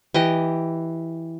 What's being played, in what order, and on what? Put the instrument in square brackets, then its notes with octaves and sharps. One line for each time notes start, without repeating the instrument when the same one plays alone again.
[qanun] E3 G4 D#5